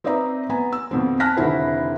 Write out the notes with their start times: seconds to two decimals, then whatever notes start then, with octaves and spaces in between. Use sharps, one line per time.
0.04 C4 D#4 B4 D5 E5 A#5
0.49 B3 G#5 A#5
0.73 E6
0.91 F2 B2 D#3 C4
1.20 G#5 A5 F6 F#6 A#6 B6
1.37 F1 D3 D#3 E4 C5